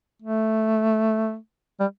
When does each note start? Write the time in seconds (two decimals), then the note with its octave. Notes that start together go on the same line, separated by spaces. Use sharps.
0.22 A3
1.80 G3